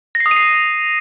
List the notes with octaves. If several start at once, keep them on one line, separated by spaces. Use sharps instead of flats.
A#6
C7
D#6
D#7
C7